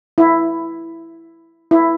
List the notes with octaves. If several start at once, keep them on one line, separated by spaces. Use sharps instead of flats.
E4
E4